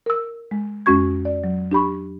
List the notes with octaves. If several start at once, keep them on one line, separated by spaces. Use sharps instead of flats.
A#4 E6
G#3
F2 G#3 C#4 F#4 C#6 G#6
D5
F#3
D4 G4 B5 C#6